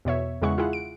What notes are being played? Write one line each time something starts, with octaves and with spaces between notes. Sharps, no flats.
E2 B2 C#5 E5
E2 C#3 G#3 E4 F#5 C#6
E4 F4 G#4 F#5
D7